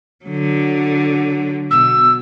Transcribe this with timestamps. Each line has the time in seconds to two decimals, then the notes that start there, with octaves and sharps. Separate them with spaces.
0.25 D3 F#3
1.70 B2 E6